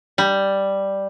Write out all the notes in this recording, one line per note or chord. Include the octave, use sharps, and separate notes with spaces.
G3